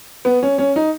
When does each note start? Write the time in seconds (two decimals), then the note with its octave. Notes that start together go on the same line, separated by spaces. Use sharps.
0.25 B3
0.43 C#4
0.58 C#4
0.76 D#4